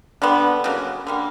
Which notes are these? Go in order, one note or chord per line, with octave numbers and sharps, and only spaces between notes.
D3 G3 B3
C#3 F#3 A#3
D3 G3 A#3